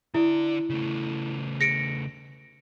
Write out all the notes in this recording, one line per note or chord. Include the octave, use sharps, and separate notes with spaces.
D3 E4 D5
C#3 A3
A#6 C#7 D7